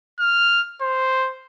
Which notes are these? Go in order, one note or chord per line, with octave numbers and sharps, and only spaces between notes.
F6
C5